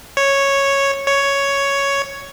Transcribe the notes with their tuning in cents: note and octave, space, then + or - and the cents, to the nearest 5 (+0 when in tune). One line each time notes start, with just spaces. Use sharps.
C#5 -5
C#5 +5